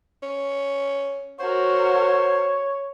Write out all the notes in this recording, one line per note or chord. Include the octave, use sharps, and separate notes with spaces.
C#4
F#4 A#4 C5 C#5